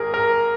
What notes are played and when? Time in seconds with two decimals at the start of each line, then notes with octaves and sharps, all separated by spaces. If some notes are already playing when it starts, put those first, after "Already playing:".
Already playing: G#1 G#4 A#4
0.14 A#4